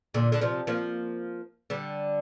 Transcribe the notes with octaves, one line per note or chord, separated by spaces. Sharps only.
A#2 D3
D3
C3 F3
F3 A#3
D3 G3